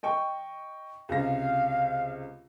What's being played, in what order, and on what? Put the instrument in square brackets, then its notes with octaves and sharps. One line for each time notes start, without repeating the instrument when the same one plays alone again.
[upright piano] D#5 G5 C#6
[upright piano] C#2 C3 A#6 [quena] F5